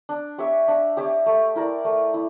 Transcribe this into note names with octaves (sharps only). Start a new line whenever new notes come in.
D4
G4 C#5 E5
D4
G4 C#5 E5
A3
E4 A#4 D5
A3
E4